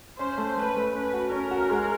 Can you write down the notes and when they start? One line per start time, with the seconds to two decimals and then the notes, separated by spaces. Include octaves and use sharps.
0.19 C#4 C5
0.38 A3
0.57 A3 B4
0.76 A3
0.94 C#4 B4
1.13 F#4
1.31 C#4 A#4
1.51 F#4
1.70 G#3